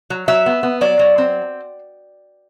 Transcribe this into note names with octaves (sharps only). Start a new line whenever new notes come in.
F#3
F#3 E5
B3
B3
F#3 D5
F#3
C4